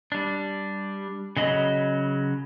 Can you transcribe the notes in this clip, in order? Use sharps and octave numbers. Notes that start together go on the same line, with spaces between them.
G3 D4
C#3 F#3 D#5 B5